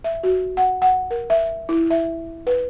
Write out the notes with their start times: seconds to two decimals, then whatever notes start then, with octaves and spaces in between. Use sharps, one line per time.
0.04 E5
0.23 F#4
0.57 F#5
0.82 F#5
1.11 A#4
1.30 E5
1.69 E4
1.90 E5
2.47 B4